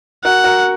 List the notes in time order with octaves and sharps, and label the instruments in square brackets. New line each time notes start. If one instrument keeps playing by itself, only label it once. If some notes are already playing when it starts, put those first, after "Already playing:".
[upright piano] F#4 A#4 [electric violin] F#5
[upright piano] F#4 A#4